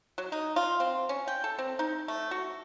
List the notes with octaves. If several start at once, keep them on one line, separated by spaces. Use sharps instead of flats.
F#3
D#4
F4
C4
C#4
G5
A4
C4
D#4
A3
F#4